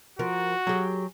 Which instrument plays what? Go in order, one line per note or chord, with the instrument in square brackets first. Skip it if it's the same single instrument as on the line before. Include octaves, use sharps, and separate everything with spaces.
[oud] F3 A#4 [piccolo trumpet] F#4
[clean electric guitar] F#3 [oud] G4 G#4